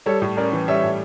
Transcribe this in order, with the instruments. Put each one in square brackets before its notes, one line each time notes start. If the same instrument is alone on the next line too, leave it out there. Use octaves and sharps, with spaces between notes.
[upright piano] G3 [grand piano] A4 C#5
[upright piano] A2
[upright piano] C#4 [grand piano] A#4 D5
[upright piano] E3
[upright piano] G3 [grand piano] C#5 E5
[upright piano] A2